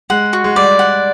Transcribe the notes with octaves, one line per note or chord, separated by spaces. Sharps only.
G#3 F#5
F#4
G#3
G3 D5
F#5